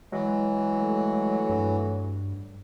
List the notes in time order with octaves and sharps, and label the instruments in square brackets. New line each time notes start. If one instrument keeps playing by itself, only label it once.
[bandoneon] E3 [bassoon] F#3 [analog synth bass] G#3
[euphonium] A3
[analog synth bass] G2